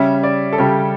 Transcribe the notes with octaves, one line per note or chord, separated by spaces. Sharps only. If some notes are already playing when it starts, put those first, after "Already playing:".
Already playing: C#3 G3 C#4 E5
D5
A4
C#3 G3 C#4 G4